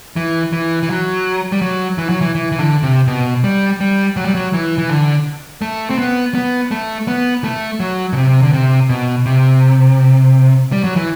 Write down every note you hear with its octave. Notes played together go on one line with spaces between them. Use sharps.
E3
E3
E3
F#3
G3
F#3
E3
F#3
E3
E3
E3
D3
C3
B2
G3
G3
F#3
G3
F#3
E3
E3
D3
A3
C4
B3
B3
A3
B3
A3
F#3
B2
C3
D3
C3
B2
C3
G3
F#3
E3